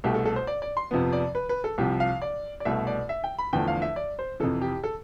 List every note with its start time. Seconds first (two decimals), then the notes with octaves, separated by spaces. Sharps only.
0.04 C2 B2 A3 G4
0.14 A4
0.25 A4
0.36 C5
0.47 D5
0.62 D5
0.77 C6
0.91 F2 C3 F3 B3
1.13 D5
1.35 B4
1.49 B4
1.64 A4
1.78 C2 C3 F3 G4
2.00 F5
2.22 D5
2.60 D5
2.65 C2 B2 A3 E5
2.87 D5
3.09 E5
3.24 G5
3.39 B5
3.53 E2 D3 F3 A3 G5
3.68 F5
3.82 E5
3.96 D5
4.19 C5
4.40 F2 C3 E3 A4
4.62 G4
4.84 A4